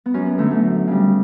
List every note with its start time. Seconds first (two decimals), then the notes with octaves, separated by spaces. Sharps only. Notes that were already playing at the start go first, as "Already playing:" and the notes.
0.06 B3
0.14 F#2 C#4
0.26 B3
0.38 D3 F#3 A3
0.51 A3
0.63 F#2
0.87 C#3 G3